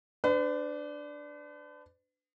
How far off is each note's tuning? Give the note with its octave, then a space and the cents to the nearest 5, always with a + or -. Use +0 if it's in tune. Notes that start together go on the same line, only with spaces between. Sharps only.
D4 +0 B4 +45